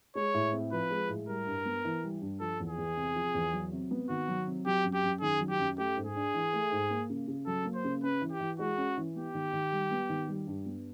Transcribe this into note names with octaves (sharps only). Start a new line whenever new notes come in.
G#3 C#5
A2
C4
F3 B4
G#3
A2
G3 A#4
G2
B3
E3
G3
G2
F3 A4
E2
G#4
E2
C3
F3
E2
F#3
C3
B3
D#3 F#4
F#3
C3
F#3 G4
F#2
G4
F#2
D#3 G#4
F#3
G4
F#2
A3 G4
G#2
G#4
D4
E3
A3
G#2
A#3
C#3
C#3
F#3 A4
A#3
C5
C#3
C#4 B4
E3
G4
E3
G#3 F#4
C#4
E3
B3 G4
D#3
D#3
G3
B3
D#3
G3
G2
B3